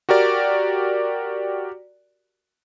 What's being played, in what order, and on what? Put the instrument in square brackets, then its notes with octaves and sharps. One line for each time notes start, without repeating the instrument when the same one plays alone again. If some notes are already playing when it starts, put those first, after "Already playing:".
[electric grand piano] F#4 G4 A#4 D5